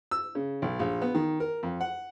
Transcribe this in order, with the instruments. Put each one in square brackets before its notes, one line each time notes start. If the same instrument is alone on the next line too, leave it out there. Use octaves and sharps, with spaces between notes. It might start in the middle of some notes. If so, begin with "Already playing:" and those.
[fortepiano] E6
C#3
B1
A#1
B3
D#3
A#4
F2
F#5